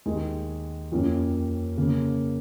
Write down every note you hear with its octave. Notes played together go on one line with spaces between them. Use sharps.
D#2 D#3 G#3
F2 F3 A#3 C#4
C#3 A#3